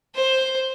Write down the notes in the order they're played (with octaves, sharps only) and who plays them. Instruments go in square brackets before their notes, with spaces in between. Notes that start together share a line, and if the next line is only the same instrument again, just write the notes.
[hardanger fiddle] C5